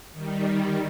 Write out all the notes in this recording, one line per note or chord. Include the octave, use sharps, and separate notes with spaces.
D#3 G3